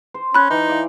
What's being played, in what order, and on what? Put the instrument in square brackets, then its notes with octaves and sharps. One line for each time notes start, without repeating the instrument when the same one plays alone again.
[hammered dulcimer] C5
[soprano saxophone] C#4 [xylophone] B5 F#6
[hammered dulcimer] E3 [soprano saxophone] D#4
[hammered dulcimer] D5 F5